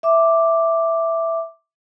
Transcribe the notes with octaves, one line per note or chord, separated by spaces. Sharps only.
E5 D6